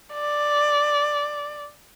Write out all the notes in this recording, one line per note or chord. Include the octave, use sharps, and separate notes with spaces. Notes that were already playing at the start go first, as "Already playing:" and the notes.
D5